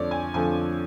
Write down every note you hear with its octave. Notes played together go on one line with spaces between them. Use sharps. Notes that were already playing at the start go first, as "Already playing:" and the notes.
Already playing: F2 D3 F3 A3 C#5 D5
G#5
F2 D3 F3 A3 G#5